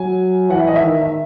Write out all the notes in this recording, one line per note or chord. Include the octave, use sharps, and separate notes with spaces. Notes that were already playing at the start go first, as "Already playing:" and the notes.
Already playing: F#3 G#5
E3 F#5
E5
D#5
E5
D#3
E5